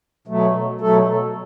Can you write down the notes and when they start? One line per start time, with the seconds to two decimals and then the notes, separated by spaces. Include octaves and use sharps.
0.27 B2 F#3 A3
0.81 B2 F#3 A3 A4